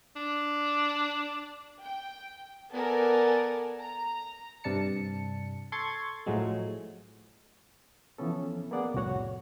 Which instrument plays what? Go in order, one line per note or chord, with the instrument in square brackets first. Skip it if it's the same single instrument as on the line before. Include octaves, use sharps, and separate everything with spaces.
[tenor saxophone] D4
[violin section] G5
B3 A4 A#4 D5 G#5
A#5
[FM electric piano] G2 C3 D4 A5 C#7
A4 C6 C#6 G#6 A6
A2 F3 F#3 G#3
[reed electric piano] E3 F3 B3 C#4 A4
A#3 B3 G#4 D5 F#5
C2 F2 A2 F#4 C#5 F#5